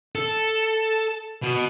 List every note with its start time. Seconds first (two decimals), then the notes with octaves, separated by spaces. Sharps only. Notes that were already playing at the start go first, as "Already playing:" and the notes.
0.15 A4
1.42 B2